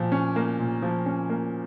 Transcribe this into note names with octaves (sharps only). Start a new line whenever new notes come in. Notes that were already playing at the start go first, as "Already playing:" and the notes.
Already playing: A#2 F3
C#4
A#3
A#2
F3
C#4
A#3